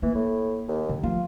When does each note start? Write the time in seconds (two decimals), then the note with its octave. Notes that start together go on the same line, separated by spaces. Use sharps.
0.02 E3 A#3
0.15 A2
0.68 D#2
0.89 D3
1.03 F3 F4